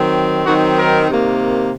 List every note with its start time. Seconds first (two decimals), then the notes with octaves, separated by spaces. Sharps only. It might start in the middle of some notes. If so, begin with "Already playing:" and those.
Already playing: D#3 F#3 C4
0.46 D#3 F#3 C4 D#4 F#4
0.78 A#4
1.08 C3 D#3 A#3